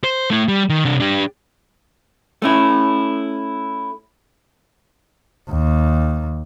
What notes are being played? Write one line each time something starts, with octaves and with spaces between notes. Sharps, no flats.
C5
A3 E4
G3
D#3
C3 D4
D4 G4
A3 C#4 E4
D#2